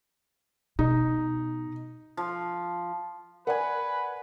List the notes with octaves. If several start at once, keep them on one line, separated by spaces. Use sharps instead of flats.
B2 D#4
F3
A#4 B4 D5 F#5 G#5